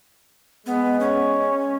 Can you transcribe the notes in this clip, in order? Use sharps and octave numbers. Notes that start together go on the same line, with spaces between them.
G#3 B3
C#4